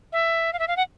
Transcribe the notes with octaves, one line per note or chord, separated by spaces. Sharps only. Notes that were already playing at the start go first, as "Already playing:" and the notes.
E5
F5
E5
F5
F#5